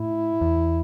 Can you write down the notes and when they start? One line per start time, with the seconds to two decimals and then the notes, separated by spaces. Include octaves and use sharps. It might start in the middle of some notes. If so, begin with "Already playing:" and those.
Already playing: A2 E4
0.41 E2